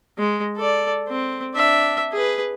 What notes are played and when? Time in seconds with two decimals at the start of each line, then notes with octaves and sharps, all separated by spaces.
0.18 G#3
0.56 A4 D5
1.08 C4
1.54 D4 E5
2.12 G#4 B4